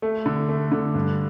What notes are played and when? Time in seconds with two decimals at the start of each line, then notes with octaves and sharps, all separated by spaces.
0.02 A3
0.26 D3
0.49 A3
0.72 D3
0.94 G2